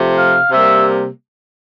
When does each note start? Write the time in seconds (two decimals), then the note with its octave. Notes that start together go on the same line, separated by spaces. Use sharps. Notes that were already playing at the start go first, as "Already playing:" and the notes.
Already playing: C3 F3 A3
0.17 F5
0.51 C3 G3 A#3 E5